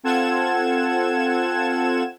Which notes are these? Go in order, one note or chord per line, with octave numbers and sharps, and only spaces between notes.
C4 F4 A4 F#5 G#6 E7